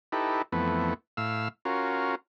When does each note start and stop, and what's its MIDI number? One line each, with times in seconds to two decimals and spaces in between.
0.12 0.42 63
0.12 0.42 64
0.12 0.42 67
0.12 0.42 69
0.12 0.42 71
0.52 0.94 41
0.52 0.94 52
0.52 0.94 57
0.52 0.94 59
1.17 1.48 45
1.17 1.48 77
1.17 1.48 88
1.65 2.15 61
1.65 2.15 65
1.65 2.15 66
1.65 2.15 70